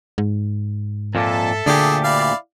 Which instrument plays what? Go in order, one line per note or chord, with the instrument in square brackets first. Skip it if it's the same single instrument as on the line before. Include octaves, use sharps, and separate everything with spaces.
[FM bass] G#2
[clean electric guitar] F2 A#2 A#3 [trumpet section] A4 E5 A5
[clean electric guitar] D2 A#2 G4 [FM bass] D3 [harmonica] D4 G#4
[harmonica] E4 D5 F5